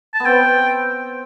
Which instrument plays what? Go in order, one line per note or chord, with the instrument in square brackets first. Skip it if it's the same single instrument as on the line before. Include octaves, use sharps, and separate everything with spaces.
[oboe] A5
[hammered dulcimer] B3
[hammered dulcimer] C4 [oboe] G5